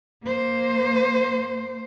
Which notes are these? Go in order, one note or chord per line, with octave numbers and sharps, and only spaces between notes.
A#3 C5